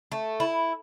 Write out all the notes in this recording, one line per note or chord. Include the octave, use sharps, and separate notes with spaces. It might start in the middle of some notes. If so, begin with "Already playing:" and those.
A3
E4